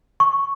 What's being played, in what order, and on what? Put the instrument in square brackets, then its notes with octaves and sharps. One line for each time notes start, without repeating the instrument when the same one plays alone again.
[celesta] C#6